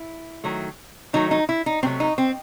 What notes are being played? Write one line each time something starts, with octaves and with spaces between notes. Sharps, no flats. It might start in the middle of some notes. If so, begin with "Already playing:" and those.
Already playing: E4
D#3 F#3 A3
D#3 F#3 A3 D#4
D#4
E4
D#4
C3 F#3 A3 C4
D#4
C4